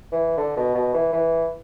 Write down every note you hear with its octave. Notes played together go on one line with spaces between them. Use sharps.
E3
D3
B2
B2
E3
E3